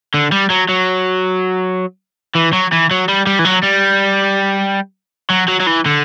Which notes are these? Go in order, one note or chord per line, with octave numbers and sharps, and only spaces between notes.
D3
G3
F#3
F#3
E3
F#3
E3
F#3
G3
G3
E3
F#3
G3
F#3
F#3
F#3
E3
D3